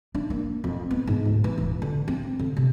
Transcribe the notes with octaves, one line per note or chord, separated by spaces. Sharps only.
D4
A#3
F2
B3
G#2
D2
E3
D#1
D3
C4
D3
C3